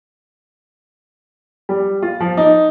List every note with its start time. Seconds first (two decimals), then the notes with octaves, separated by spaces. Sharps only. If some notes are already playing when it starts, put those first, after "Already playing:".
1.69 G3
2.03 F4
2.20 F3
2.37 D#4